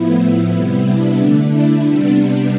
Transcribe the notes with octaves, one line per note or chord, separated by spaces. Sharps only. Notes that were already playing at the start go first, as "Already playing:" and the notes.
Already playing: A2 F3 B3 E4
C3 G3 B3
D4
D3 A3
E4
C3 G3 B3 D4